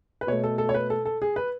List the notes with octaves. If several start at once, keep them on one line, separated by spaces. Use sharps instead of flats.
B4
B2 A3 C#5
A4
A4
C#5
B4
A4
A4
G#4
B4